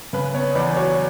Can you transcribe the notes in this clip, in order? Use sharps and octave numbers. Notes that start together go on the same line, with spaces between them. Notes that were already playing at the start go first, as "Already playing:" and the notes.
C#3 B4
B3 C#5
E2 B4 D5
F#3 C#5